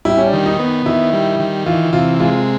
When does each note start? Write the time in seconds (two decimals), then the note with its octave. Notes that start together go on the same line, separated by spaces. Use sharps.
0.05 G3 E4
0.17 C#4
0.26 D4
0.33 D#3
0.46 D#4
0.59 B3
0.86 D#3 E4
1.13 G3
1.40 D#3
1.66 E3 F4
1.93 C3 F4
2.20 G#3 F4